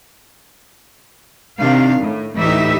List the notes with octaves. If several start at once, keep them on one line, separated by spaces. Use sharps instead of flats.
C3 D#3 D4 F5
A2
D2 A2 E3 D#4 G4 E5